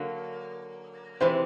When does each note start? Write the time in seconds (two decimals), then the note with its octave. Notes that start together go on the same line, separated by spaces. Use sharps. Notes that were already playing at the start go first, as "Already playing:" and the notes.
Already playing: D3 F#3 A#3
1.20 C3 E3 G#3 C5